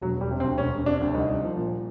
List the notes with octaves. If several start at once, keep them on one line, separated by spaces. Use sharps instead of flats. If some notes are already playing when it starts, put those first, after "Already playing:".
E1 F#3
E1 G3
C3
C4
D2
E1 C#4
E1
C3 D4
D2
C2 D#4
C2
F3
A#2